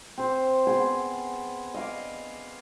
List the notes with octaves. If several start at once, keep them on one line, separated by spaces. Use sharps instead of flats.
C4 C5
B3 G#4 C6 D6
D#5 F5 D6